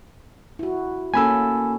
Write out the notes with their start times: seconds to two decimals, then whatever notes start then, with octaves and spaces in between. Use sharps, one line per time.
0.59 E4 F#4
1.14 A#3 C#4 A4 G#5 B5 E6